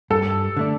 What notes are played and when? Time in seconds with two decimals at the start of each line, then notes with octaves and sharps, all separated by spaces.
0.10 G2 A4
0.57 D3 A3 D4